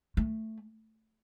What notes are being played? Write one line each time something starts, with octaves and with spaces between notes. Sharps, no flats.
A3